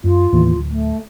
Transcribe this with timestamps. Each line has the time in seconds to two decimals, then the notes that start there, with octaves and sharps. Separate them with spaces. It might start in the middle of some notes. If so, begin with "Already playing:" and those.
0.04 F#2 F4
0.33 D#2 A2 E3
0.53 D1
0.70 A3